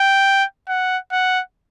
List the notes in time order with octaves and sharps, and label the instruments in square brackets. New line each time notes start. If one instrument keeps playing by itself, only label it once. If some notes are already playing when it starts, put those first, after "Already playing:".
Already playing: [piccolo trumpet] G5
F#5
F#5